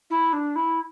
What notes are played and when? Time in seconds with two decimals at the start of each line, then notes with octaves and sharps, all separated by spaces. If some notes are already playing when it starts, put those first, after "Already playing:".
0.10 E4
0.33 D4
0.56 E4